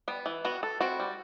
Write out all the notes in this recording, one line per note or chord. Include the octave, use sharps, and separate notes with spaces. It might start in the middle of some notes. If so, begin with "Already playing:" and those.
G3 B3
E3
G3 B3 F#4
A4
C4 E4 F#4
G3